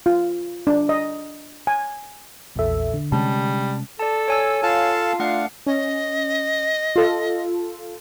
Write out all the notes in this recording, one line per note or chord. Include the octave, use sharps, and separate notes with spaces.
F4
D4
D#5
G#5
A#1 E2 A#2 A4 E5
D3
C3 G3 G#3 C#4 A5
A4 D5 A5
C#5 G#5 E6
F4 A4 F5 A5
A3 D4 F5 F#5 C7
C#4 D#5
F4 A4